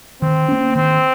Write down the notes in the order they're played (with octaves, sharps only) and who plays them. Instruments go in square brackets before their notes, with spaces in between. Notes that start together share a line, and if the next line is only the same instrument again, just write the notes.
[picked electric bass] D#3 [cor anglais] C4
[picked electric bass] A#3 C#4
[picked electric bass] D#3 [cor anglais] C4